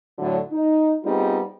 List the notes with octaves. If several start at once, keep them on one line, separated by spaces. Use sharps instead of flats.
A2 D3 F#3
D#4
G3 B3 C4 D#4 F4 G#4